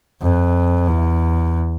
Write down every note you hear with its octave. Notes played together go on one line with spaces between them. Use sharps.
F2
E2